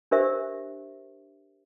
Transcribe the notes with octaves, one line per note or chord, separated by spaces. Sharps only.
D4 G4 A#4 C5 E5